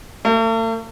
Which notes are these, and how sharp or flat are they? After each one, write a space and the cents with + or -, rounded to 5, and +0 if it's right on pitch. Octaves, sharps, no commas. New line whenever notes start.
A3 +45